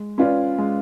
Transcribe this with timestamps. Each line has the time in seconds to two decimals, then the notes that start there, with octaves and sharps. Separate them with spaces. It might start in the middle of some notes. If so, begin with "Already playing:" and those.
Already playing: G#3
0.18 C#4 F4 B4 D5
0.58 G#3